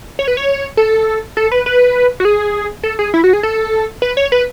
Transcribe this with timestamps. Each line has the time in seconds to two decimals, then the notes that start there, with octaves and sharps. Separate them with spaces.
0.19 C#5
0.28 B4
0.37 C#5
0.77 A4
1.37 A4
1.51 B4
1.66 B4
2.20 F#4
2.25 G#4
2.83 A4
2.99 G#4
3.14 E4
3.24 F#4
3.33 G#4
3.43 A4
4.02 B4
4.17 C#5
4.32 B4